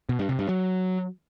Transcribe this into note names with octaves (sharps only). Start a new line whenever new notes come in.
B2
G2
C3
G2
F#3